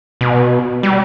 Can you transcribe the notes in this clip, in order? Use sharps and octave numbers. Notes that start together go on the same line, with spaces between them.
B2
G3